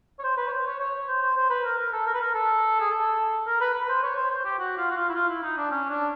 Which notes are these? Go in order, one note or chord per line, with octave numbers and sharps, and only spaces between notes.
C#5
C5
B4
C#5
C5
C#5
C#5
C5
C5
C5
B4
A#4
A#4
A4
A#4
B4
A#4
A4
G#4
A4
A#4
B4
B4
C5
C#5
C5
C5
G4
F#4
F4
F#4
F4
E4
F4
E4
D#4
D4
C#4
D4